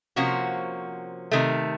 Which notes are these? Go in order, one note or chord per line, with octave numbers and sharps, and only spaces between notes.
C3 F3 A#3 C#4 F#4
C3 D#3 A3